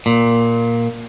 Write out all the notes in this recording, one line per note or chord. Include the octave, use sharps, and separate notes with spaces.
A#2